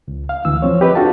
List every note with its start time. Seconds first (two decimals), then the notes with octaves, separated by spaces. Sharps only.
0.08 C#2
0.29 F5
0.45 D2 E3 E6
0.62 E2 F3 C4 C#5
0.81 G4 B4 D#5
0.95 D4 F4 F#4 A4 F5 A5